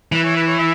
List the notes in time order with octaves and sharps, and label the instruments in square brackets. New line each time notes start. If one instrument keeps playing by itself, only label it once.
[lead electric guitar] E3 [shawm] B4
[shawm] C#5
B4
C#5
E5